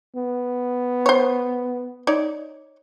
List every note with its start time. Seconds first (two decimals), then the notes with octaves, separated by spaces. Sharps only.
0.16 B3
1.06 C5 C#5
2.07 D#4 C#5 D5